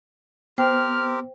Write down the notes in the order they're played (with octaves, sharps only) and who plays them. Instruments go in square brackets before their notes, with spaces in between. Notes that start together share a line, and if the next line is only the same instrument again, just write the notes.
[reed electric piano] B3 [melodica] C4 G4 A#4 [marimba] C5 G5 [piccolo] F6